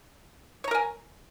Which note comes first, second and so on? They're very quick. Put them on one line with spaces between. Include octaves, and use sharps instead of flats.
C#5 A#5 A#4 G#5